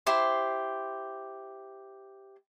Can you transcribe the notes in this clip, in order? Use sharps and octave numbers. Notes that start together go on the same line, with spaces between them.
E4 G4 C5 C6